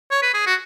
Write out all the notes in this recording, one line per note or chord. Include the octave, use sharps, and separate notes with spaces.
C#5
B4
G#4
F#4